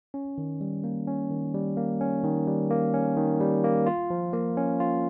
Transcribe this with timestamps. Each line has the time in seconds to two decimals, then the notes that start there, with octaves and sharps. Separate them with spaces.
0.14 C#4
0.38 D#3
0.61 G3
0.84 A#3
1.07 C#4
1.30 D#3
1.54 G3
1.77 A#3
2.01 C#4
2.24 D#3
2.47 G3
2.70 A#3
2.94 C#4
3.17 D#3
3.41 G3
3.64 A#3
3.86 F4
4.10 F3
4.33 A#3
4.57 C#4
4.80 F4